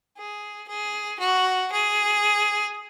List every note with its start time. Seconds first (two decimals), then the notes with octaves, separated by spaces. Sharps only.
0.17 G#4
0.68 G#4
1.20 F#4
1.72 G#4